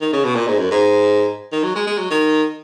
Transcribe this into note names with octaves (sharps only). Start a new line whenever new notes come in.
D#3
C#3
B2
A#2
G#2
F#2
G#2
D#3
F#3
G#3
G#3
F#3
D#3